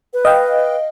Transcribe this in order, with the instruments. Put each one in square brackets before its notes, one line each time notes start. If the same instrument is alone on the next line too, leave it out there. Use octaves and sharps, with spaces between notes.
[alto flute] B4
[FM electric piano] D#5 F5 G5